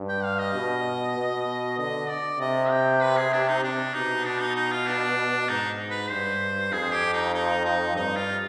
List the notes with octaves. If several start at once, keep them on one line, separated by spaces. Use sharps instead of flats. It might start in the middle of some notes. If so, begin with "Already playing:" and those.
Already playing: G2
G5
F5
D#5
B2
B2
D3 D#5
D5
C3 D#5
G5
B4
G#4
D4
D#4
C3 D4
B2 D#4
D4
D#4
D#4
F4
D4
G#2 D#4
B4
G2 C5
F2 G#4
G4
D#4
D#4
D#4
G2 D#4
F4